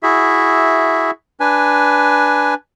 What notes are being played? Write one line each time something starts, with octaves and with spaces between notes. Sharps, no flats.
E4 F#4 G#4 E5
D4 B4 G#5